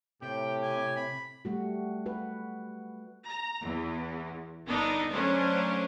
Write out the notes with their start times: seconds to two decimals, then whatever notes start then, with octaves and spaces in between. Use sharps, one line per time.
0.22 A2 C3 G4 G5
0.63 G#5
0.96 B5
1.45 G3 A3 F#4
2.06 F#4 B4
3.27 A#5
3.63 E2 E3
4.67 G1 B3 D4 D#4 A4 A#4
5.11 F#3 A3 C#4 D4 A#4 C5